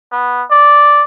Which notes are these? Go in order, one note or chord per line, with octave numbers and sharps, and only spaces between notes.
B3
D5